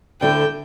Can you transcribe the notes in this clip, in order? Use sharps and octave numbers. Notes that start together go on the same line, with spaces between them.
D2 D3 A3 E4 G5